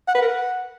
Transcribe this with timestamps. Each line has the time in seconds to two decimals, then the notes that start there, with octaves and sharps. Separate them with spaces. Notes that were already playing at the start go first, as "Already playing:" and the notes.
0.08 F#5
0.15 B4
0.21 A#4
0.28 F#5